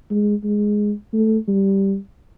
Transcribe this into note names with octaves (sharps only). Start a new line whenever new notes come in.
G#3
G#3
A3
G3